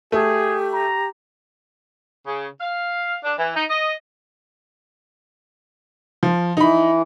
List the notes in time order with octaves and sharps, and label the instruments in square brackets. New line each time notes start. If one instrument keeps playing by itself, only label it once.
[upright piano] A3 [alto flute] G4 [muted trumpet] G#4
[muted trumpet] A#5
[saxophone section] C#3
F5
D4
E3
D#4
D#5
[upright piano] F3
[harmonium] E3 [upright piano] D#4 B5